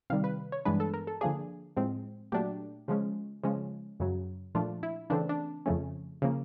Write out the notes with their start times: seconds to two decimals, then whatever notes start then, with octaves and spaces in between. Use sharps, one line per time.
0.10 C3 D#3 G3 F5
0.24 B4
0.52 C#5
0.65 G2 E3 G#3 B3 D4 B4
0.80 A4
0.94 A#4
1.07 A4
1.21 D3 F3 A#3 D4 G#4
1.77 A2 F3 G#3 C4
2.32 A#2 F#3 A3 D4 G4
2.88 C#3 F3 G#3 C#4
3.43 C#3 F3 G#3 C#4
4.00 F#2 C#3 F#3
4.55 A#2 F3 A3 D4 F4
4.83 E4
5.10 C#3 E3 A3 C4 D4
5.29 D4
5.66 F2 C#3 F3 A3 C#4
6.22 C#3 F3 A#3